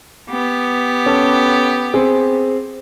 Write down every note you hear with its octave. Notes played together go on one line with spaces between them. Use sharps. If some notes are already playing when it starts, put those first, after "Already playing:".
B3 G4
C#4 A4
C4 G#4